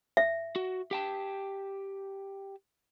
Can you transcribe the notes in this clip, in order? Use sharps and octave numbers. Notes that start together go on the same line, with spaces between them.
E5
F#4
G4 G5 A5